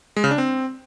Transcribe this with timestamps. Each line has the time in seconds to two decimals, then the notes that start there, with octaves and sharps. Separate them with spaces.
0.16 G#3
0.24 C#3
0.31 D4
0.38 C4